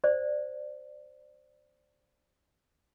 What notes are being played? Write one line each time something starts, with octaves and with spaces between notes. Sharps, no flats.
C5 D5